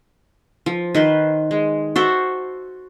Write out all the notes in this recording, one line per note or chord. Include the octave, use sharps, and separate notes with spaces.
F3
D#3 B4 C5
G#3
F#4 A4 C5 E5